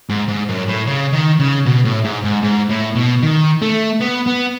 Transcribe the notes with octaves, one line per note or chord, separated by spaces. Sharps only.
G#2
G#2
F#2
A2
C#3
D#3
C#3
B2
A2
G#2
G#2
G#2
A2
B2
D#3
A3
B3
B3